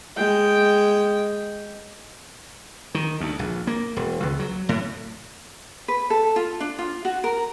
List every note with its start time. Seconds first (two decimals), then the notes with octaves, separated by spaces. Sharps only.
0.17 G#3 G5
2.95 D#3
3.20 D2
3.39 A#1
3.67 A#3
3.96 E1
4.23 C#2
4.39 F#3
4.69 A2
5.88 B4
6.10 A4
6.36 F4
6.60 D4
6.78 F4
7.05 F#4
7.24 A#4